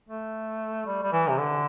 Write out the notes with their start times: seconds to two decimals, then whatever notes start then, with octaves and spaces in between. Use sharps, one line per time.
0.09 A3
0.86 G3
1.03 G3
1.12 E3
1.29 C3
1.38 D3